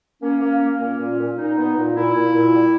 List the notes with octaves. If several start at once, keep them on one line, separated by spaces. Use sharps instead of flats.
A#3 C#4
A#3
A#3
A#2 C#4
A#2
A#2
A#2 D#4
B3
A#2
A#2 E4
A#2
A#2
G3